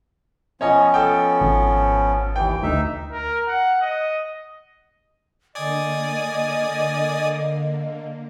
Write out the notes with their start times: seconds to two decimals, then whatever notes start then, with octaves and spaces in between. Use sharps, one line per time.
0.61 F3 B3 C#4 C#5 D#5 G#5
0.94 A4 G5
1.41 G#1
2.36 D#2 E3 G5
2.63 D2 D#4 E5
3.12 A#4
3.48 F#5
3.81 D#5
5.55 D3 A#3 D5 D#5 G#5 D#6